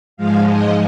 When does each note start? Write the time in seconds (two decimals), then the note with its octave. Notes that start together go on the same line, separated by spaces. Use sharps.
0.17 G#2 F3 G#3 F5
0.48 D#5